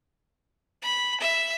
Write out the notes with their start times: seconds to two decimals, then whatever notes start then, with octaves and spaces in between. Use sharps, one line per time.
0.82 B5
1.20 E5